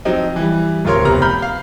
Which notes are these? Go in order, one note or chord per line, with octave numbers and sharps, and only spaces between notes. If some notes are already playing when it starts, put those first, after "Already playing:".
F3 F#3 C4 D#4
E3 G3
D1 C3 F4 A#4 C#5 C6
F1 C3 B3 A#5 F6
B5 F6 G6
F5